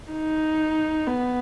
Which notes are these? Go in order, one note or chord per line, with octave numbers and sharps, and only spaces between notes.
D#4
B3